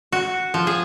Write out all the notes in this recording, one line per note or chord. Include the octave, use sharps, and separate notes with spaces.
F#4
F3
G#4